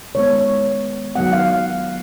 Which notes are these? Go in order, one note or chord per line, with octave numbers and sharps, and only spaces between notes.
D#3 G#3 B3 C#5
D#3 F#3 B3 F#5
F5